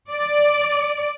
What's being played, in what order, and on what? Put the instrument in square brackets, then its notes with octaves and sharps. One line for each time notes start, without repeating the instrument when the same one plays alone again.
[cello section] D5